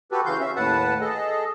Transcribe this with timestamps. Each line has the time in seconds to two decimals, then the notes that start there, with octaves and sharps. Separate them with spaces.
0.12 F#4 G4 A4 B4
0.26 C#3 E3 F#4 F5 C6 G6
0.40 C#4 E5
0.56 D#2 A2 B4 F#5 A5
1.01 G#4 A4 D#5 A5